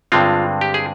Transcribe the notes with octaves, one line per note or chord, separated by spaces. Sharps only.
G2 D3 G#3 C4 F4
G4
G#4